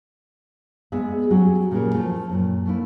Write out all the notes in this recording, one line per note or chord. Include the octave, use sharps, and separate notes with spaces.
G#3 B3 G#4 D5 E5
F#3 G3 C#4 F#4 G#4
A#2 C#3 G3 C#4 G#4 A#4
F3 A3
F#2 A#2
A3 A#3 E4